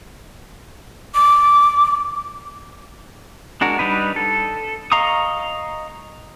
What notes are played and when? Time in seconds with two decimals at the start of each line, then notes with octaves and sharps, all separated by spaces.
1.15 D6
3.61 G#3 D4 F#4 A#4
3.79 G3 D4 D#4 B4
4.16 A4
4.92 D#5 F5 A#5 C#6 D#6